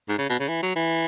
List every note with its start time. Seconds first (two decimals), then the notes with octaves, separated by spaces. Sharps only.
0.09 G#2
0.19 C#3
0.29 B2
0.40 C#3
0.49 E3
0.63 F#3
0.76 E3